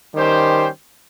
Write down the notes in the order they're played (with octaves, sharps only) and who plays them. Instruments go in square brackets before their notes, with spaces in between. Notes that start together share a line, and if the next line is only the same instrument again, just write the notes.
[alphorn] D#3 [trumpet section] G3 C#4 G4 C5 G5